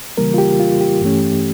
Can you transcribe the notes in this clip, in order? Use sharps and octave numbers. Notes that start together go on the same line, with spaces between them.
C#3 E3 G3 A#3 A#4
F4
G4
F4
G4
G2 E3 A3 C#4